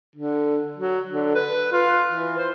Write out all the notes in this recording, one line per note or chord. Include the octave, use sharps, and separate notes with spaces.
D3
F#3
D3
B4
F4
E3
C5